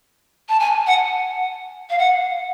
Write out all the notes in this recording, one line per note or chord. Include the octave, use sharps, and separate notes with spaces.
A5
G#5
F#5
F5
F#5